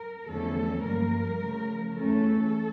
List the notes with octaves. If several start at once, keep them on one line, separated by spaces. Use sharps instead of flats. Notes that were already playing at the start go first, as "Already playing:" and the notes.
Already playing: A#4
E2 D3 F3 A3 C#4 A4
G2 F3 A#3 A#4
C#3 F3 A3
E2 E3 A3 C#4 A4